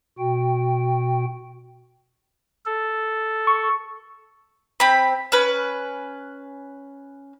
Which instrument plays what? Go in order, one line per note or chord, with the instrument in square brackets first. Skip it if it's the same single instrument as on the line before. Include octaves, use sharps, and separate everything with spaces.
[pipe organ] B2 F#4 G5
A4
[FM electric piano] C#6
[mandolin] C4 B5
C#4 B4